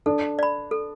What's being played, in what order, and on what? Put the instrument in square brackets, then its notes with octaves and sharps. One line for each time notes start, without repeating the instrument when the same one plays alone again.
[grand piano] D4 [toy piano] A4
[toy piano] D5 B5
A4